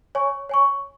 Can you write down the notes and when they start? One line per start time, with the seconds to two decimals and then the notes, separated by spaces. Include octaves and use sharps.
0.15 C#5 G#5 C#6
0.49 C#5 G#5 C#6